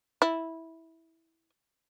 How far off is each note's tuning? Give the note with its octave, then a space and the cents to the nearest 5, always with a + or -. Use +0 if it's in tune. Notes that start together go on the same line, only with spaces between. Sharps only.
E4 -10